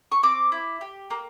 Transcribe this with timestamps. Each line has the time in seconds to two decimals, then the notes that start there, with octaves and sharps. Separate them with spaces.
0.12 C#6
0.23 C4 D6
0.52 E4
0.81 G4
1.11 A#3